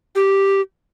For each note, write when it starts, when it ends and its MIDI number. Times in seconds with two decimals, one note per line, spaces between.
0.15 0.61 67